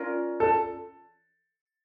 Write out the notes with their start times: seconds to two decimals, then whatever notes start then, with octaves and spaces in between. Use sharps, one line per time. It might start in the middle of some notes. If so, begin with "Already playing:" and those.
Already playing: C#4 F4 A#4 D5
0.40 A4